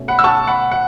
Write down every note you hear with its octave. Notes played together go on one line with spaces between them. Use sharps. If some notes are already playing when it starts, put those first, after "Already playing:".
Already playing: B2 A3 C#4
F#5 B5
E6
A5 C#6
F#5 B5
F#5